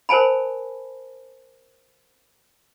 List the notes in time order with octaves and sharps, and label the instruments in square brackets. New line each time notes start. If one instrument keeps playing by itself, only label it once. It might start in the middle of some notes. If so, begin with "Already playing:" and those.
[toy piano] A#4 C5 G#5 A5 B5